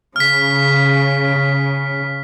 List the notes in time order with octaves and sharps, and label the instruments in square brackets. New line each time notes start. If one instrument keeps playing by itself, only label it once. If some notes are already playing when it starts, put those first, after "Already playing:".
[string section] C#3 [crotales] F6 B6